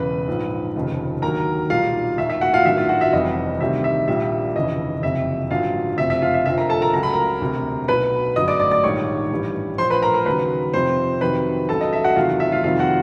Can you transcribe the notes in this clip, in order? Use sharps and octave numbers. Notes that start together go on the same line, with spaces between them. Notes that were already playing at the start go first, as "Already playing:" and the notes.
Already playing: E1 E2 C#3 B4 B5
A#1 G#2 F3
F1 D#2 C#3 F3
D#2 D3 F#3 A#4 A#5
B1 A#2 G3 F4 F5
E1 D#2 D#3 E5
E5
F#4 F#5
F4 F5
A1 G2 D#3 F#3 E5
F4 F5
F#4 F#5
E5
F1 F2 C3 E3 G3 D#5
D2 C3 D#3 G3 E5
E5
A#1 A#2 G3 E5
F1 D#2 C#3 E3 D#5
F#1 F2 C3 E5
A1 G2 D3 F#3 F4 F5
F#1 F2 C3 F3 E5
E5
F4 F5
E5
F1 F2 D3 F3 E5
A#4 A#5
A4 A5
A#4 A#5
C#2 C#3 F#3 A#5
B5
A#4 A#5
E1 D2 C3
B1 B2 F#3 B4 B5
G1 F#2 D3 F#3 D#5 D#6
D5 D6
D5 D6
D5 D6
A#1 G#2 D#3 G3 C#5 C#6
A1 G2 E3 G3
A#1 A#2 F3 C5 C6
B4 B5
A#4 A#5
A#4 A#5
D#2 C#3 F#3 B4 B5
F2 C3 F3 C5 C6
F2 C3 D#3 F#3 B4 B5
C#2 C#3 F#3 A4 A5
D#5
E5
F#4 F#5
E2 C3 D#3 F#3 F4 F5
E5
F4 F5
F2 C3 D#3 G3 F4 F5
F#4 F#5